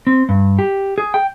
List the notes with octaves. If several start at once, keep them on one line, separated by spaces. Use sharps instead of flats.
C4
G2
G4
G#4
G5